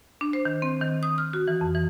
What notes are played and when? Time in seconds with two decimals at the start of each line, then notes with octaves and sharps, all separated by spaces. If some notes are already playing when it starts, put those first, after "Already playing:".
0.21 D4
0.33 C5
0.45 D#3
0.62 C4
0.82 D#3
1.03 D#6
1.18 F6
1.33 F#4
1.48 E3
1.61 F2
1.75 E3